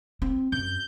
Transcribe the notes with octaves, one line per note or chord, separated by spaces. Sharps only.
C4
F#2 G6